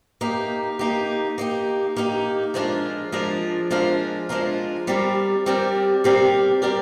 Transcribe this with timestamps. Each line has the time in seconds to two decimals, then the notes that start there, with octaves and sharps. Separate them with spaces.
0.21 A#3 D#4 G4
0.79 A#3 D#4 G4
1.38 A#3 D#4 G4
1.96 A#3 D#4 G4
2.54 F3 G#3 D4 F4 A#4
3.12 F3 G#3 D4 F4 A#4
3.71 F3 G#3 D4 F4 A#4
4.29 F3 G#3 D4 F4 A#4
4.87 G3 C4 G4 A#4 D5
5.46 G3 C4 G4 A#4 D5
6.04 G3 C4 G4 A#4 D5
6.62 G3 C4 G4 A#4 D5